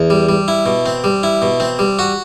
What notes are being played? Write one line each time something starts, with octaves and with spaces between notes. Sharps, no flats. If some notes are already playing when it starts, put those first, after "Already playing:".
Already playing: E2
G3
G3
E4
B2
C4
G3
E4
B2
C4
G3
F#4